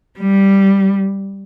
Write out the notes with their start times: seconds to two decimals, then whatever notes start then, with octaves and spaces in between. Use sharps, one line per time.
0.20 G3